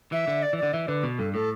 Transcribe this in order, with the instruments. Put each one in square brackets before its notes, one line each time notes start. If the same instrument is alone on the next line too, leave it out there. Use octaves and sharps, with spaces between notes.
[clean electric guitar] E3 [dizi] E5
[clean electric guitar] D3
[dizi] D5
[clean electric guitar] E3
[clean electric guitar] D3 [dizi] D5
[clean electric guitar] E3 [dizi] E5
[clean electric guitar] D3 [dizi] B4
[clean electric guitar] B2
[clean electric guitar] G2 [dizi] A4
[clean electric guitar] A2 [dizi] A4